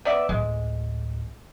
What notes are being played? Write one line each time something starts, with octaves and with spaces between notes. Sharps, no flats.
B3 D5 E5
A1 D2 G#3